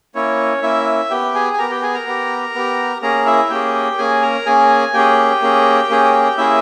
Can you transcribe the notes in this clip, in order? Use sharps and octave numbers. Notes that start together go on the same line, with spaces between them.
A#3 C#4 E4 C#5
A#3 C#4 E4 E5
B3 G4 G5
G#4 G#5
G#5
B3 G4 A#4 A#5
G4 G5
G#4 G#5
A#4 A#5
B3 G4
B3 G4
A#3 C#4 G#4 A#4 A#5
E4 E5
A#3 C#4 G4 G#4 G5
A#3 C#4 G#4 G#5
A#4 A#5
A#3 C#4 G#4 G#5
A#3 C#4 G4 G#4 G5
A#3 C#4 G#4
A#3 C#4 G#4
A#3 C#4 E4 G#4 E5